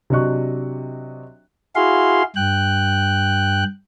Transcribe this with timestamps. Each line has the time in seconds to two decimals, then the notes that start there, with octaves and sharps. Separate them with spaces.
0.10 C3 F#3 D4 D#5 C#6 F#6
1.76 E4 F#4 G#4 F5 C6
2.36 G2 G5 F#6